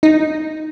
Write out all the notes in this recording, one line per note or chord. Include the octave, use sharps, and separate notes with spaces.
D#4